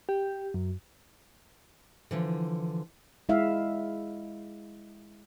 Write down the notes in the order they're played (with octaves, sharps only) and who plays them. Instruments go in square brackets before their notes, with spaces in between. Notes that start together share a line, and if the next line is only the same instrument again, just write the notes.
[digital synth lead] G4
F#2
[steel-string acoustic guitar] D3 E3 F3
[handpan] G#3 E4 E5 F5